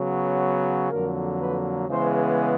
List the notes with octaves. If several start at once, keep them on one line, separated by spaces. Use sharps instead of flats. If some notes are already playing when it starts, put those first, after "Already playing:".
Already playing: C#3 F#3 B3
F2 D3 F#3 A#3 A#4
B4
C#3 E3 G#3 B3 C5